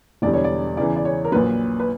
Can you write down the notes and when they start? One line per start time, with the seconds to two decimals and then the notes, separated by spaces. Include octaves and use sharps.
0.22 E1 E2 D3 G3 D5
0.33 C#5
0.44 D5
0.77 E2 C#3 E3 D5
0.96 D5
1.05 C#5
1.25 A#4
1.32 A#1 A#2 F#3 B4
1.80 B4